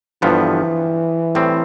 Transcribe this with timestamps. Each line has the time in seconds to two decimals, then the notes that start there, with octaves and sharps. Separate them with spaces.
0.22 G1 G2 E3 F3 B3
1.35 A2 G3 C4